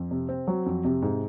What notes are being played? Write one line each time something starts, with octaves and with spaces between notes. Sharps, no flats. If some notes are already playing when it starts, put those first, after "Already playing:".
Already playing: F2
C3
C4
F#3
F2
C3
G#2